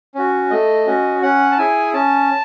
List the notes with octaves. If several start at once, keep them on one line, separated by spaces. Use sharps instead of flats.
C#4 F#4
A3 D#5
C#4 F#4
C#4 F#5
A5
E4 G#4 G#5
C#4 A5